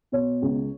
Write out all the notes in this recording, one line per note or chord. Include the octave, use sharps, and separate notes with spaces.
B2 C#5
C#2